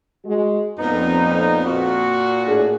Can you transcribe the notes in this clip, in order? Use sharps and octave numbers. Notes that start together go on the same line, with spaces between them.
G#3 F#4
F2 A#2 B3 D#4
A#2 F#4
A2 D4 G#4